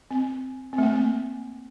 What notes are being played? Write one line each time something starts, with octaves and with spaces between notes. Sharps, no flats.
C4
C4
A3
A#3
C4